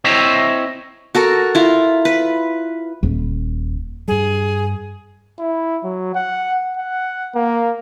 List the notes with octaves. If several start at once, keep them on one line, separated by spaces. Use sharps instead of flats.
C4 E4 C5 C#5 D#5 E5
F#4 A4 A#4
E4 F4
B4
D#1
G2 G3 G#4
E4
F#3
F#5
F#5
A#3